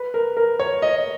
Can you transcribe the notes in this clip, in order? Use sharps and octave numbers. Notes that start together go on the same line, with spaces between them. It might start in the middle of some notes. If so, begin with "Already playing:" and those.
Already playing: B4
A#4
A#4
C#5
D#5